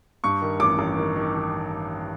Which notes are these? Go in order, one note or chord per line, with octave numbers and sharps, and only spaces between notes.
G2 C#6
D#3
A1 D6
A1
D#3
D#3
D#3